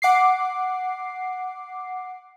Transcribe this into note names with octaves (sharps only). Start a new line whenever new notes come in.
F#5 D6 C7